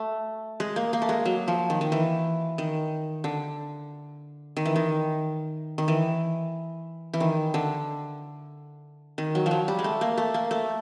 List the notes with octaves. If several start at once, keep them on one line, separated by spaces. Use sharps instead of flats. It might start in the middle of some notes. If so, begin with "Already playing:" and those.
Already playing: A3
G#3
A#3
A#3
A3
G#3
F#3
F3
D#3
D#3
E3
D#3
D3
D#3
E3
D#3
D#3
E3
E3
D#3
D3
D#3
F#3
F3
F#3
G3
G#3
A3
A#3
A3
A#3
A3